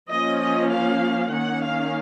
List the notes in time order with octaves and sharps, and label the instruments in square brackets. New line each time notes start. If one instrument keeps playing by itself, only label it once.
[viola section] F3 A#3 C#4 D#5
D#5
F5
D#3 A#3 C#4 F#5
F5